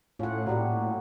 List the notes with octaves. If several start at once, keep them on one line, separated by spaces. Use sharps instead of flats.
A2 C#4 F4 F#5
A#2 F#3 G3 F#4 G4